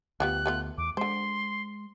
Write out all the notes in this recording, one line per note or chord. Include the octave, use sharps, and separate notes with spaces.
D2 F3 G3 B3 F#6
A3 B3 F4
E2 D6
D3 G#3 C5 C6